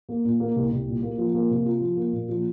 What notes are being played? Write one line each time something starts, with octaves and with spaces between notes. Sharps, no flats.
A#3
A#2
A#3
C2
C2
A#2
A#3
F3
A#3
C3
F4
F3
A#3
A#2
F3